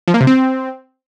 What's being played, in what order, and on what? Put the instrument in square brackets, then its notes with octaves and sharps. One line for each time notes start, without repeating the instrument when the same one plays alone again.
[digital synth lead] F3
A#3
C3
C4